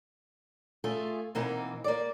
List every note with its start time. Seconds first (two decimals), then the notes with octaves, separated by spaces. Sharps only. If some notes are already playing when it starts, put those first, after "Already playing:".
0.84 A3 F4 G#4
1.35 B2 E3 A#3 C4 D#4
1.84 A#3 D5